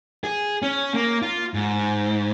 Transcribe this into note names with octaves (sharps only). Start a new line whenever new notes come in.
G#4
C#4
A#3
F4
G#2